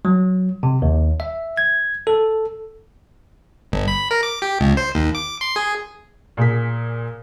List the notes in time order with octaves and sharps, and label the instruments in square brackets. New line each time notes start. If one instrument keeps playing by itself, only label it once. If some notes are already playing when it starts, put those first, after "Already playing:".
[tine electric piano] F#3
C3
D#2
E5
G#6
A4
[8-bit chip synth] G1
B5
A#4
D6
G4
C#2
C5
D#2
D6
C6
G#4
[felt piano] A#2 G#4 B6